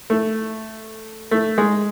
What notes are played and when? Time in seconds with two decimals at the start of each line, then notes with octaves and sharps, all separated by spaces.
0.10 A3
1.31 A3
1.58 G#3